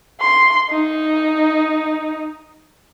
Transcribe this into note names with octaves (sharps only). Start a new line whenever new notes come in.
C6
D#4